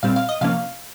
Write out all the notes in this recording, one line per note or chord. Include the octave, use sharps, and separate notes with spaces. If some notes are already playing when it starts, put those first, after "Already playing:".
A#2 G3 C4 F5
F5
D#5
C3 F3 A#3 C#4 F5